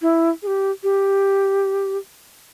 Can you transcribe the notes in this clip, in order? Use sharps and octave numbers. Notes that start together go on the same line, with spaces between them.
E4
G#4
G4
G4